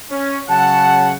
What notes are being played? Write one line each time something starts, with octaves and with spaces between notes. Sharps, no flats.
C#4
C#3 F#3 F#5 A5